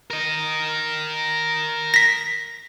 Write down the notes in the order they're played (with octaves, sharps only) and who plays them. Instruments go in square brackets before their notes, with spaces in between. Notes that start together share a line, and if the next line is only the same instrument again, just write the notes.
[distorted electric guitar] A#4 D#5
[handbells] A#6 B6